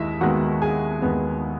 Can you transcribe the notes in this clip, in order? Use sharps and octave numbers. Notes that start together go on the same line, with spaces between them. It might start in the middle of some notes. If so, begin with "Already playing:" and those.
Already playing: D#2 D#3 G#3 E4 D#5 E5
D#2 D#3 G#3 B3 F#4 F#5
G#4 G#5
D#2 D#3 G#3 B3